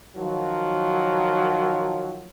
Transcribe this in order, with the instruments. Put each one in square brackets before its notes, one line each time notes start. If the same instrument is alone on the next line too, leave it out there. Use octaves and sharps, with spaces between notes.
[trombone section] D#3 F3 F#3